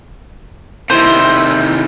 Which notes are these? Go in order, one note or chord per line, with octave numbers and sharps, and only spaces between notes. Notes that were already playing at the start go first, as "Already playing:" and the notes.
C3 D#3 E4 C5